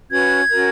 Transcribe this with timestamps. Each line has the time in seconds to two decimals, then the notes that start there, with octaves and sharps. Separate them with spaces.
0.09 C#4 F#4 B4 G#6
0.50 C#4 F#4 A#4